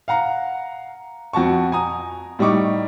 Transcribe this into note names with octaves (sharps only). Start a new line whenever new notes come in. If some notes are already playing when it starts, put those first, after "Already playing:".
F5 F#5 A#5
F2 F#4 A5 C#6
G#5 A#5 D#6
A2 G3 D#4 C#6 D6